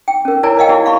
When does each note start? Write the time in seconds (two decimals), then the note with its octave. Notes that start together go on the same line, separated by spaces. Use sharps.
0.08 G5
0.25 C#4 A#4
0.43 E4 A#4 C#5 D5 G#5 A#5
0.57 A#4 C#5 D#5 F5 G5
0.69 E4 F#4 G4 A#4 D5
0.85 E4 F5 B5 C#6